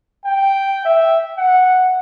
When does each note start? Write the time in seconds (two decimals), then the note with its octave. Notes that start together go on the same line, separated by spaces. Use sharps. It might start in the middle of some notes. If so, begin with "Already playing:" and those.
0.26 G5
0.85 E5
1.37 F#5